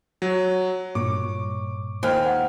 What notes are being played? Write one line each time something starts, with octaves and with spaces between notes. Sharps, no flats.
F#3 C#5
G2 A#2 C#6 D6
D#2 C5 G5 G#5 F6
F#5